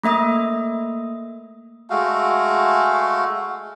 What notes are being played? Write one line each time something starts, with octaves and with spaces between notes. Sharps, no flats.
A3 A#3 E5 D#6
G#3 A3 F#4 F5